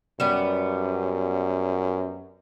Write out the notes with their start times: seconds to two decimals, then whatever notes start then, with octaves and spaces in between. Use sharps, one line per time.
0.20 F#2 G3 B3